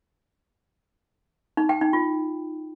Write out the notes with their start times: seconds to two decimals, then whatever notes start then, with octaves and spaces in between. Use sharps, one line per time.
1.57 D#4
1.69 G5
1.81 D#4
1.93 F4